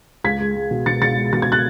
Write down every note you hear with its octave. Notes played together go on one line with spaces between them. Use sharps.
C#2 G#6 B6
G#3
G#3
B2
B2 A6 C#7
B2 A6 C#7
G#3
B2 A6
G#6
F#6 A6